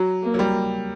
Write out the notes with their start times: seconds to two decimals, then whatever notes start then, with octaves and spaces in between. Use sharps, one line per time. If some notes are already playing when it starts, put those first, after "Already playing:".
Already playing: F#3
0.23 A#3
0.34 F#3
0.39 G3